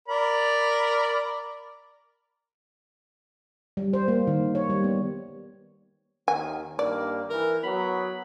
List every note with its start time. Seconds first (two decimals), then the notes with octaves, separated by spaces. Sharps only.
0.08 A#4 D5 B5
3.77 G3
3.93 C5
4.08 A#3
4.27 D#3
4.55 C#5
4.70 G3
4.84 B3
6.28 D#2 D#3 G#5
6.79 G2 D#3 A#3 D5
7.30 E3 A#4
7.63 F#3 B3 B5